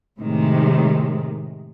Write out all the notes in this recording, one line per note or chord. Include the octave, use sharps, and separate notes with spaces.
A2 C3 D#3 G#3